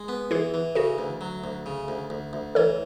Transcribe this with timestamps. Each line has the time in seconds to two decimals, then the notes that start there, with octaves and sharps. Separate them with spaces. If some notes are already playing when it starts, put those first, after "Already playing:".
Already playing: G#3
0.08 B3
0.31 E3 E4 G#4
0.54 E3
0.75 C#3 F#4 A4
0.98 D2
1.21 F#3
1.44 D2
1.66 C#3
1.88 D2
2.10 D2
2.33 D2
2.55 E3 A4 C#5